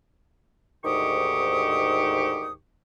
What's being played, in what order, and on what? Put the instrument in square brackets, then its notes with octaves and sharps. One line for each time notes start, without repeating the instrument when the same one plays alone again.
[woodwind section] D2 G#2 D#3 G4 C#6 D#6